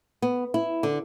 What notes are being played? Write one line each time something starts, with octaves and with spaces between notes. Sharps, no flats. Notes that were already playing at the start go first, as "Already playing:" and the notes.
B3
E4
D3